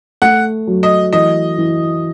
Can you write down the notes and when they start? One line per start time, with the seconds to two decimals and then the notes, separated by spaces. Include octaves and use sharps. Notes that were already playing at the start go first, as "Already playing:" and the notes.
0.22 A3 F#5
0.67 F#3
0.83 D#5
1.13 E3 D#5
1.58 E3